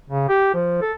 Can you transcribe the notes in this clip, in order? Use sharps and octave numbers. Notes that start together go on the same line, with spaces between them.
C#3
G4
F3
A4